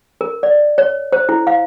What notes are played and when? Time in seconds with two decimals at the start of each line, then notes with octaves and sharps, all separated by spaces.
0.21 A#4
0.43 D5
0.78 C#5
1.12 C5
1.29 E4
1.47 F5